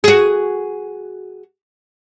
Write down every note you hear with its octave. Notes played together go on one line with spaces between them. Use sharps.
F#4 G#4